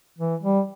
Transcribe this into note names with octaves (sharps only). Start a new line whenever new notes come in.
E3
G3